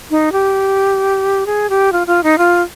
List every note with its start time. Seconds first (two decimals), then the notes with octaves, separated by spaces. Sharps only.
0.11 D#4
0.32 G4
1.46 G#4
1.70 G4
1.93 F4
2.07 F4
2.23 D#4
2.38 F4